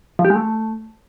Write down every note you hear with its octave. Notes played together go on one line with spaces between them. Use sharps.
F3
G4
G#3
A3